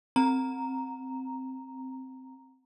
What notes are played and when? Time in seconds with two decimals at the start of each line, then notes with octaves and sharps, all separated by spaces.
0.16 C4 A#5